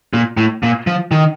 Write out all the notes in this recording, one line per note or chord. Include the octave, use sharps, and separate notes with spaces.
A#2
A2
A#2
F3
D#3